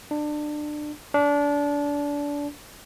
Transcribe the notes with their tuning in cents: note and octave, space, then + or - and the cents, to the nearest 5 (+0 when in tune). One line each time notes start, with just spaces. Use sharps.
D4 +25
D4 -25